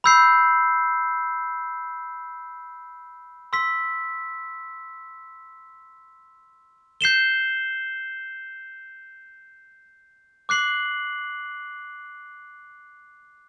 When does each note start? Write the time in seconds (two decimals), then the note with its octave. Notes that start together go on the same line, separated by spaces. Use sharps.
0.04 B5 E6 G6 C7
3.53 C6 E6 B6
7.01 G6 C7 E7 G7
10.49 D6 F#6 C7 F#7